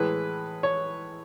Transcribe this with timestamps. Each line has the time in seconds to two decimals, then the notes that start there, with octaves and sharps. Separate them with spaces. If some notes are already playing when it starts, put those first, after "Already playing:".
Already playing: A2 E3 G#3 B4
0.63 C#5